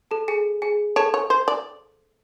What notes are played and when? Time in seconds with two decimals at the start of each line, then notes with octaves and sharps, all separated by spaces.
0.11 A4 A5
0.28 G#4 G#5
0.62 G#4 G#5
0.96 A4 C#5 A5
1.14 C#5
1.30 C5
1.48 D5